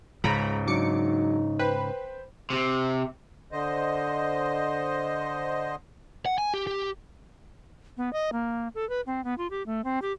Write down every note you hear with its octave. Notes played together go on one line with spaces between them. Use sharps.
C#2 G#2 C#3 A#5 B5
F#3 D4 D#4 C#5 D6 C#7
B4 C5 G5 B5
C3
D3 C5 D#5
F#5
G#5
G4
G4
B3
D#5
A#3
A4
B4
C4
B3
F4
G4
A3
C4
G4